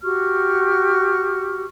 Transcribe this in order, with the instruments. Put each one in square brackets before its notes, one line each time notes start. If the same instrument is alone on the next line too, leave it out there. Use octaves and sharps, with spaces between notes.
[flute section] F#4 G4 C#6 F6